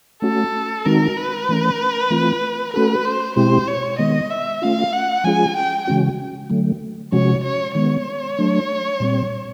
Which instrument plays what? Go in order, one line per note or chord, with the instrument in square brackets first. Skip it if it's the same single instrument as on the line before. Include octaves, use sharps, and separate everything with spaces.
[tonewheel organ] A3 C#4 F#4 [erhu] A4
[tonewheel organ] D#3 G#3 C4 D#4 F#4 [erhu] A#4
[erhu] B4
[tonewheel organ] E3 A3 C#4
E3 A3 C4 F4
[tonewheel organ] A3 C#4 F#4 A4 [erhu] B4
[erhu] C5
[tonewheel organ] B2 G#3 C4 E4 G4 [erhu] C5
[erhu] C#5
[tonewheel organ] D#3 G#3 B3 [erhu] D#5
[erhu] E5
[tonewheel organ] A3 C#4 F4 [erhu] F5
[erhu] F#5
[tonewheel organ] F3 G#3 C#4 F4 G#4 [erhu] G#5
[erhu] G5
[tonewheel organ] C#3 E3 G#3 C#4 F#4
D3 F#3 A3
[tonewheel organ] C3 F3 G#3 C#4 F#4 [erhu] C#5
[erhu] C#5
[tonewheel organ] D#3 G#3 B3 [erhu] C#5
[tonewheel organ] F#3 A3 D4
A#2 G3 C4